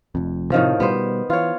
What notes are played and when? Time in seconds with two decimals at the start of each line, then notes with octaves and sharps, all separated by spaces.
0.15 F1 F2
0.52 A2 C3 D#3 F3
0.80 B2 G3 B3 C5
1.30 E3 F4 C#5